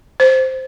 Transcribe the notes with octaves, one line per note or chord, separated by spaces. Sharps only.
C5